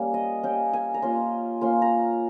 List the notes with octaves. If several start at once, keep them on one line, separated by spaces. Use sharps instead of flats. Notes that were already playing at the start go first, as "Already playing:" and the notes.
Already playing: G3 A#3 C#4
D#5
G3 A#3 C#4 G5
G#5
A#5
A#3 C#4 F4 C6
A#3 C#4 F4 C6
A#5